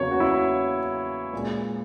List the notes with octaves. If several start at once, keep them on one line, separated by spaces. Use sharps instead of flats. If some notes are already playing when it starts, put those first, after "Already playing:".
Already playing: E2 C#3 F#3 A#3 C#5
F#4
E4
A#2 G#3